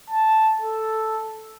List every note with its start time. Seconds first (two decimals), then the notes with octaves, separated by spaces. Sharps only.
0.10 A5
0.61 A4